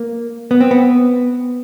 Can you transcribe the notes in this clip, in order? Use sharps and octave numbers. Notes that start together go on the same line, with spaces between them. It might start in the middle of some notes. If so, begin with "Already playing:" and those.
Already playing: A#3
B3
C4
B3